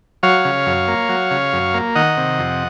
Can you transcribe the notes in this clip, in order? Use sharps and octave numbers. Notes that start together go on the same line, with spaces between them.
F#3 C#5 F5
C#3
F#2
A#3
F#3
C#3
F#2
A#3
D#3 D#5 F#5
C3
F2